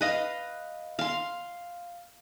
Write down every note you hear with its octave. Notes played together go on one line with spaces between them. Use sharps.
B4 D#5 F5
F5 C6